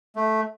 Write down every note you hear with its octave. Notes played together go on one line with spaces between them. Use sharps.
A3